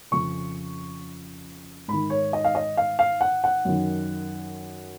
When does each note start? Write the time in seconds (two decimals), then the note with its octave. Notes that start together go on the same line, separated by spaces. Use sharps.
0.11 F2 C#3 C#6
1.88 G#2 D#3 B5
2.10 C#5
2.33 D#5
2.45 F5
2.55 D#5
2.77 F5
2.99 F5
3.21 F#5
3.44 F#5
3.65 F#2 D#3